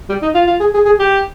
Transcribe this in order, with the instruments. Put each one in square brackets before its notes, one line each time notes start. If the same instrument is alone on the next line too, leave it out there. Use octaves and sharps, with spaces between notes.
[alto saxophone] G3
D#4
F4
F4
G#4
G#4
G#4
G4